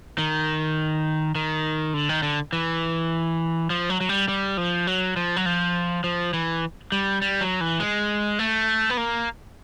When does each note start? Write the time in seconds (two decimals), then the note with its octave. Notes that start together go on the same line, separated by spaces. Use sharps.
0.18 D#3
1.35 D#3
1.94 D3
2.09 D#3
2.23 D3
2.53 E3
3.70 F3
3.90 F#3
4.01 F#3
4.09 G3
4.28 G3
4.58 F3
4.87 F#3
5.16 F3
5.36 F#3
5.46 F3
6.04 F3
6.33 E3
6.92 G3
7.22 G3
7.41 F#3
7.61 E3
7.80 G#3
8.39 A3
8.90 B3
8.97 A#3